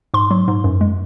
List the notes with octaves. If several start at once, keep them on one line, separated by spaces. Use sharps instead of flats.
G#2 C6
F#3
G#2
F#2
G#3